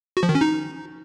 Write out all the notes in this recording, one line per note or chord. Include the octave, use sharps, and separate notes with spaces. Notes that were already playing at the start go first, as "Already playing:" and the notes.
F#4
F3
D#3
C#4
D#4